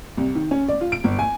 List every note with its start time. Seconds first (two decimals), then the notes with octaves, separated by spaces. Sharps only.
0.17 C2
0.35 D#3
0.51 C#4
0.68 D5
0.81 F4
0.92 D7
1.04 G1
1.19 G#5